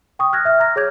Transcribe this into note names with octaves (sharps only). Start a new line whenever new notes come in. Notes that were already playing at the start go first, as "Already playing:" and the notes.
G5 C#6 D#6
F6 F#6 G#6 A#6
E5 F6
A#5 F6 A#6
G#4 C#5 D6 G6 G#6